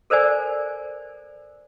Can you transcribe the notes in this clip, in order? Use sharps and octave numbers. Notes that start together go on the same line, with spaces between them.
A4 A#4 C5 D5 G#5